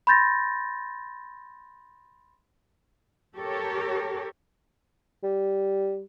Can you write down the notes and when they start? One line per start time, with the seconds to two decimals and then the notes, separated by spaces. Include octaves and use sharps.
0.07 B5 C6 G6 A6 A#6
3.36 G4 A4 A#4 C#5
5.23 G3